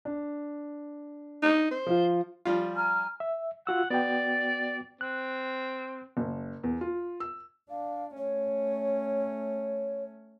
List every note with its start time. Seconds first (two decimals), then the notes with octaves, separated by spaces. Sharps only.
0.05 D4
1.43 D#4
1.71 C5
1.86 F3 F4
2.45 F3 G3 F4
2.75 G#5 A#5 F6
3.20 E5
3.67 F4 F#4 F#5 E6
3.90 B3 F#4 D5 G5
5.01 C4 F#6
6.17 F#1
6.64 E2
6.81 F4
7.20 E6
7.70 D4 F5
8.17 A3 C#4 C#5